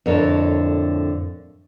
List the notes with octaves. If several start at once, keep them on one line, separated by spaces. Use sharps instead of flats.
F2 A2 D3 A#4 C#5 A5